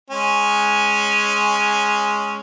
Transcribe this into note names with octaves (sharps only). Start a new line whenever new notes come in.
G#3 C#4